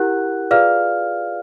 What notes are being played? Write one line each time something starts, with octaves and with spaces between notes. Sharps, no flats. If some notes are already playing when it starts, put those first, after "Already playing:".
Already playing: E4 G4 A#4 F#5 F#6
F4 G#4 B4 D5 F5 F6